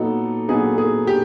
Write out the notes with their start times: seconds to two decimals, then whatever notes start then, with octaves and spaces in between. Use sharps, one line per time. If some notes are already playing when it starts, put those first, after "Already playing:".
Already playing: A#2 F#3 B3 D#4 A4
0.49 A#2 F#3 B3 D#4 G#4
0.78 G#4
1.07 G4